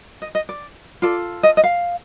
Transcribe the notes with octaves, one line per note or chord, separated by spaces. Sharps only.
D#5
D#5
D5
F4 A4 D5
D#5
D#5
F5